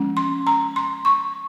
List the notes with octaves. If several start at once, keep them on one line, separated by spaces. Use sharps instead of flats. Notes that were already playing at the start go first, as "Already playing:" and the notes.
Already playing: F3 G#3 C#4
C6
A#5
C6
C#6